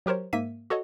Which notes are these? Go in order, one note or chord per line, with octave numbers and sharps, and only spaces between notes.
F#3 G4 A#4 C5 C#5
G#2 A#3 E5 B6 D#7
F#4 A4 C#5 D#5